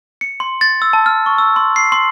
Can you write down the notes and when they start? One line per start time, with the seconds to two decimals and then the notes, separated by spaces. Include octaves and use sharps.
0.21 C#7
0.40 C6
0.61 A6
0.82 E6
0.93 A5
1.06 F6
1.26 C#6
1.38 E6
1.56 C6
1.76 C7
1.92 C6